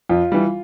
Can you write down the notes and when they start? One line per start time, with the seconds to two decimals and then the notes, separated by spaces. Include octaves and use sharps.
0.09 F2 F4
0.32 E3 G3